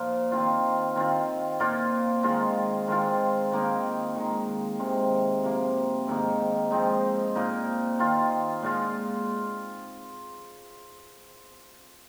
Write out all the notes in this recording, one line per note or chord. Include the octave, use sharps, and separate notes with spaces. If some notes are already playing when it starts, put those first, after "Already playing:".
Already playing: A#2 F3 A#3 D#4
D#3 C4 F4
D#3 C4 F4
A#2 A#3 F4
D#3 G#3 F4
D#3 G#3 C4 F4
D#3 A#3 D#4
D#3 G#3 D#4
C3 D#3 G#3 C4
C3 F3 A#3
G#2 D#3 A#3 D#4
F3 G#3 C4 D#4
A#2 A#3 D#4
D#3 C4 F4
A#2 G#3 F4